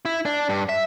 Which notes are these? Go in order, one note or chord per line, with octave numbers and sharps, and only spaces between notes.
E4
D4
G2
E5